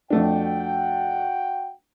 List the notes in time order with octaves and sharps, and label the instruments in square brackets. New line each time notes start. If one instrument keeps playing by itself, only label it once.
[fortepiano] F2 A3 D4 [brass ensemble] F#4 F#5 G5